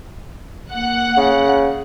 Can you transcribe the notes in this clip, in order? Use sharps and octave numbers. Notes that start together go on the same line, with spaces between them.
A#3 F#5 F#6
C#3